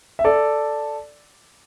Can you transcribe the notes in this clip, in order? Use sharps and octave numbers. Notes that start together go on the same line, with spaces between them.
E5
A4 D5